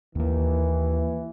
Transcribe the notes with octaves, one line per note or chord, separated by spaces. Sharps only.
D#2 E3 A#3